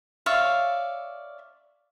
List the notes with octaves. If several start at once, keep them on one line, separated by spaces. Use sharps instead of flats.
C#5 D5 E5 F5